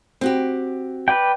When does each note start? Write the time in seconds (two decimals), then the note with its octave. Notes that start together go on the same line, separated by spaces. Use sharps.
0.21 C4 F#4 G4
1.08 B4 D5 G5